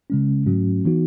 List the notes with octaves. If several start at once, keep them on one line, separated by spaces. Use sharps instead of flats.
C#3 G#3 C#4
G#2 F#3 A3 C#4 F#4
E3 B3 D#4 F#4